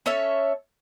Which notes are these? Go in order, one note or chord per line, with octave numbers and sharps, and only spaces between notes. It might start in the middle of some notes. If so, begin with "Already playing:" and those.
C#4 A4 C#5 E5